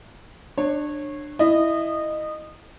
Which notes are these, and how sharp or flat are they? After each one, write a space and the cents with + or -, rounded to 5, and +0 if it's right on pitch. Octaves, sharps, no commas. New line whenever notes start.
D4 +20 C#5 -20
E4 +0 D#5 -20